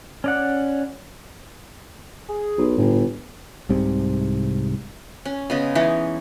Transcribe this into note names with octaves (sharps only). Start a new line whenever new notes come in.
C#4 D5 F#5
G#4
B1
G1 A2
C2 G#2 C3
C#4
C#3 G#3 B3
E3 C#4 D#4 C#5